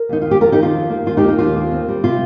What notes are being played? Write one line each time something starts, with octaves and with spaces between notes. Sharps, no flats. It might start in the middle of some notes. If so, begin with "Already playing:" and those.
Already playing: A#4
D#2 D#4
D#3 F4
G4
F2 F4 A#4
D#4 G4
D#3 F4
F2
A#3
D#2 F4
D#4 G4
A#3
D#4
D#2 F4
A#3
C4
G3
C3 F4